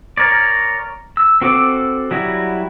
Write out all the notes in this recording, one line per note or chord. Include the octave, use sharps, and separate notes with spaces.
A#4 C#5 D5
E6
C4 F#4 A4 D6 E6
F#3 G3 E4 F#4